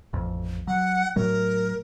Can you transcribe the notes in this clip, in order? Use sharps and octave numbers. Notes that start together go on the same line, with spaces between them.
A1 F2
F#3 F#5
A2 F#3 A3 A#4